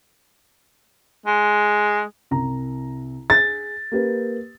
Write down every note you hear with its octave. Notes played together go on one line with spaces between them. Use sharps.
G#3
C2 A#5
G#4 A6
A#3 G4 B4